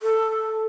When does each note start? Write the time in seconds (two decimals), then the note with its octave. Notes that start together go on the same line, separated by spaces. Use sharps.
0.03 A4